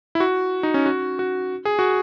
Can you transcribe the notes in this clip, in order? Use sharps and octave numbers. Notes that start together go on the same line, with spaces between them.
E4
F#4
D#4
C#4
F#4
F#4
G#4
F#4